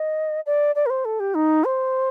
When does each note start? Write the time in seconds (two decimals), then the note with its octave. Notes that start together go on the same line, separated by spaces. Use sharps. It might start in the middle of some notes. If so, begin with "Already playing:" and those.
Already playing: D#5
0.46 D5
0.75 D5
0.86 A#4
0.90 C5
1.05 A4
1.20 G4
1.35 D#4
1.64 C5